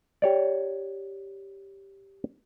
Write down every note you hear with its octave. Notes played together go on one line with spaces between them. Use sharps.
G4 C#5 D5